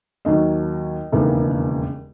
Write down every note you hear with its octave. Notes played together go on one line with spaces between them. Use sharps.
D#2 D#3 F#3 D#5
E1 D#2 C#3 E3 A#3